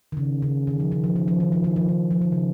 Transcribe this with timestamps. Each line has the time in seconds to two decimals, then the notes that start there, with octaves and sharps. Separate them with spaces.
0.12 D#3
0.17 C#3
0.42 C#3
0.67 D#3
0.80 F3
0.92 D#3
1.04 F3
1.16 D#3
1.28 F3
1.40 D#3
1.52 F3
1.64 D#3
1.76 F3
1.89 D#3
2.11 F3
2.22 D#3
2.32 C#3